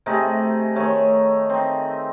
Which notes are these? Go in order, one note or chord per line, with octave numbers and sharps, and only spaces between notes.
C3 A3 D#4 G#4
D#3 A3 G#4 C#5
C4 D#4